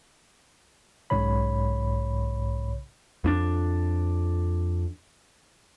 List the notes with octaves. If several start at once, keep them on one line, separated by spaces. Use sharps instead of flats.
B1 G#2 C#3 C#5 B5
F2 C#4 D4